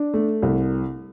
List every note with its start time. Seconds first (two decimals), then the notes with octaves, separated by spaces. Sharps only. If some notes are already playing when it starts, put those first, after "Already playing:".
Already playing: D4
0.14 A3
0.42 C2